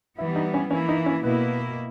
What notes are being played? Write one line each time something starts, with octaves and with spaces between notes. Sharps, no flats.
E3 G3 B3 E4
D#4
C#4
E3 A#3 C#4 E4
D#4
C#4
B2 A#3 B3 E4